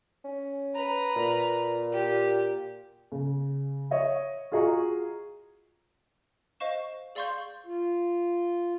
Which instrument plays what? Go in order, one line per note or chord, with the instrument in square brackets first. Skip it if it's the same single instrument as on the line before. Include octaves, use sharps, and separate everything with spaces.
[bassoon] C#4
[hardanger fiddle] B4 A#5
[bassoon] A#2
[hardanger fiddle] G4
[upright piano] C#3
C#5 D#5 E5
F4 F#4 G#4 D#5 A#5 C#6
[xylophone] C5 D#5 F5 C#6 E7
G#4 D5 F5 C6 C#6 G6
[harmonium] F4